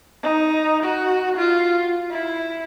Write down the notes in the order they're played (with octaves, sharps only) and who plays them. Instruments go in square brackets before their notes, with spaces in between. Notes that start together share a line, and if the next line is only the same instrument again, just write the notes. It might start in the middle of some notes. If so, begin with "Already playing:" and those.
[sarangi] D#4
F#4
F4
E4